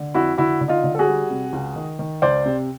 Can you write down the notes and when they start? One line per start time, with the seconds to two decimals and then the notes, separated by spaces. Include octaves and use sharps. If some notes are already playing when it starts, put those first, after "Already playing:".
Already playing: D3
0.14 F2 E4 F#4
0.38 D3 E4 F#4
0.61 D3
0.68 D#4 F4
0.84 D3
0.95 A4
0.99 F#4 G#4
1.07 G3
1.30 C3
1.53 C#2
1.76 D#3
1.99 D#3
2.22 C#2 C5 D5
2.46 C3